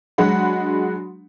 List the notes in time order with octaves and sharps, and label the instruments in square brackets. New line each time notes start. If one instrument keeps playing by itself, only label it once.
[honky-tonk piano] F#3 G#3 D4 F#4 F#5 B5